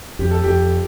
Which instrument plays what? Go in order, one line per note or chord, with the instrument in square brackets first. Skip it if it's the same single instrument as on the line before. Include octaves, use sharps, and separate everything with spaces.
[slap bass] F2 [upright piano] G4
[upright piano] A4
[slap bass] F2 [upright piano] G4